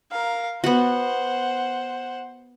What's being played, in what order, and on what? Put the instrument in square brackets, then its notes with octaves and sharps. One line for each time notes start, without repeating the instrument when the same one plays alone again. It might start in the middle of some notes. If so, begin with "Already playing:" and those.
[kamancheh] A#4 F5
[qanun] B3 F#4 [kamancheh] C5 F#5